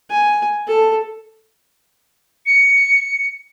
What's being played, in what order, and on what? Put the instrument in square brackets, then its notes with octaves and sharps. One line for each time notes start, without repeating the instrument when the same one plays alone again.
[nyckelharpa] G#5
A4
[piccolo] C#7